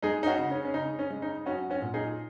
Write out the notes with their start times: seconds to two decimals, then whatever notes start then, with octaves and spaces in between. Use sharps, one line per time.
0.02 G#3 D#4 G#4
0.23 D#4
0.26 C#4 F#4
0.38 C#3
0.51 C#4
0.65 C#4
0.74 C#3 D#4
0.99 C#4
1.10 G#3
1.22 D#4
1.46 F#3 C#4 F#4
1.70 C#4 F#4
1.82 A#2
1.94 D#4 G#4